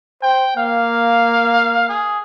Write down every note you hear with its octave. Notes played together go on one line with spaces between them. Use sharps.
C5 G5
A#3 F5
G#4